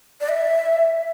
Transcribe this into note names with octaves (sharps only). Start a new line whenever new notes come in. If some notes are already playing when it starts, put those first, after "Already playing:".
D5
E5